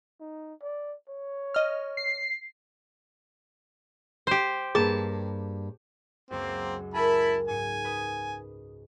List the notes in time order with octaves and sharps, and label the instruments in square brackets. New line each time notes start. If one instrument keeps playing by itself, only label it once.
[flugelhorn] D#4
D5
C#5
[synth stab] D#5 F6
[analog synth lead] C7
[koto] G4 C5
[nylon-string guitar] G2 A#3 [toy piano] G#4 [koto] A5
[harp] C#2 F#2 [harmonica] A#3 C4
[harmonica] E4 A5 B5 [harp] A#4 G#5
[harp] G#2 C#7 [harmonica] G#5
[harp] B4 D#6